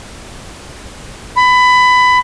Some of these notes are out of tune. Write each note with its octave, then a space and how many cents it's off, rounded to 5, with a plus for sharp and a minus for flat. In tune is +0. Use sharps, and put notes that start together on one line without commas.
B5 +20